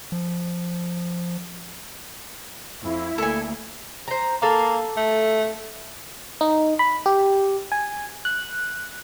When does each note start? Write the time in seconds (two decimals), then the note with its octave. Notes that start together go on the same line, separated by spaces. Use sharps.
0.12 F3
2.83 F2 E4
3.18 D2 A#3 A4 G#5
4.08 C5 A#5
4.42 A#3 A4 F5
4.97 A3
6.41 D#4
6.79 B5
7.06 G4
7.72 G#5
8.25 F#6